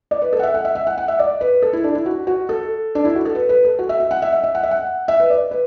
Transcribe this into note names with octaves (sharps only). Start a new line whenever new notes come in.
D5
B4
A4
F#5
E5
F#5
E5
E5
F#5
F#5
E5
D5
B4
A4
E4
D4
E4
F#4
F#4
A4
D4
E4
F#4
A4
B4
B4
A4
F#4
E5
E5
F#5
E5
E5
E5
F#5
E5
F#5
E5
B4
D5
B4